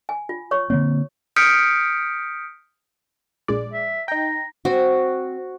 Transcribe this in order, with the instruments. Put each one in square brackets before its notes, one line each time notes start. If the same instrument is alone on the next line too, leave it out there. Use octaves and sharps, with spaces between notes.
[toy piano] G#5
F4
C#5 C#6
[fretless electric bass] D3 A#3 C4 [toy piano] C#5
[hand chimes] D#6 F6 G6 B6 C#7 D7
[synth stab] A#1 G#3 D5
[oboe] E5
[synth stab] D#4 G5 [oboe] A#5
[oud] C4 [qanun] F#4